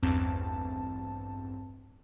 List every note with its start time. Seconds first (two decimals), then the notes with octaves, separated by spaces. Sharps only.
0.03 A1 E2 G2 C4 A5